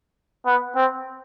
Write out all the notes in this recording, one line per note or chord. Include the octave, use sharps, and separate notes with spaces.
B3
C4